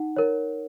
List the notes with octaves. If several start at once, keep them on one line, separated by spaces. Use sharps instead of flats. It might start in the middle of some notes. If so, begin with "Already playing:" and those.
Already playing: D#4 F#5
A#4 C#5